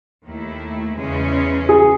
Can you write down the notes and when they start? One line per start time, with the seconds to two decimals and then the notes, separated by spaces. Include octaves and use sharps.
0.25 D#2 D#3 A3 E4
0.97 E2 C#3 E3 G#3 C#4
1.69 G#4